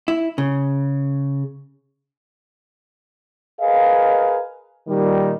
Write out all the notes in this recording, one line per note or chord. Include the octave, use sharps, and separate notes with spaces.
E4
C#3
G#4 A#4 B4 D#5 F5
A#2 D#3 G3